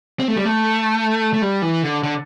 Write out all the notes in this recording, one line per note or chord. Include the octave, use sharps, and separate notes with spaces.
C4
A3
G3
A3
A3
G3
E3
D3
D3